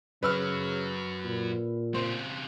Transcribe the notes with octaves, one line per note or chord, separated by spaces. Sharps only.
F#2 C#3 F#3 B4 E6 F6
A#2
C#3 C4 C5